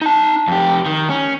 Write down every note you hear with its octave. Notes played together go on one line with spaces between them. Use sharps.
D#4 A5
F2 G4
D#3
C#4